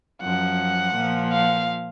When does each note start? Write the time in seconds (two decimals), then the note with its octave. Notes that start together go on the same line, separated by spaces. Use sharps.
0.22 F#2 F3 F#5
0.96 A#2 F3
1.33 F5